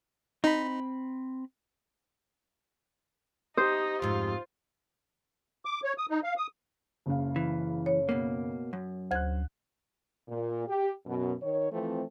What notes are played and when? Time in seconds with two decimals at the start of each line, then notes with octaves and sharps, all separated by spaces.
0.44 C4 D#4 B5
3.57 D#4 G4 C5 D#6
4.02 F2 G#2 F4
5.65 D6
5.84 C#5
5.98 D#6
6.10 D#4
6.24 F5
6.37 D#6
7.06 F#1 C#3 F5
7.36 E3
7.86 C#5
8.09 B2 A#3
8.73 F#2
9.11 D2 C5 F#6 G#6
10.29 A#2
10.68 G4
11.06 F#2 B2
11.42 D#3 C#5
11.71 E3 F3 A3 C4